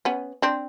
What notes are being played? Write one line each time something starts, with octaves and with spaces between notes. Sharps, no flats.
B3 C#4
C4 D4